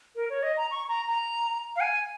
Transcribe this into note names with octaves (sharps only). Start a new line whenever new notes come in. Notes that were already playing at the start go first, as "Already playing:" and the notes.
A#4
C#5
D#5
A#5
C#6
A#5
A#5
F5
G#5